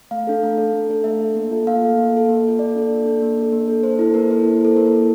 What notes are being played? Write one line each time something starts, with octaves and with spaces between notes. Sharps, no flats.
A3 F5
D4 A4
A3
D4 A4
A3
D4 A4
A3 E5
D4 A4
A#3
F4 A4
A#3 F5
F4 A4
A#3
F4 A4
A#3
F4 A4
A#3 D5
D4 A4
A#3
D4 A4
A#3
D4 A4
A#3
D4 A4
A#3 C5
E4 A4
A#3 A#4
E4 A4 C5
A#3
E4 A4
A#3 A#4
E4 A4